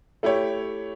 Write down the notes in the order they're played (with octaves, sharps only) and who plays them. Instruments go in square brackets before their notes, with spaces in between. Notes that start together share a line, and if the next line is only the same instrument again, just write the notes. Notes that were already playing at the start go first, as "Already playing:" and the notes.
[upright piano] A3 E4 G4 C#5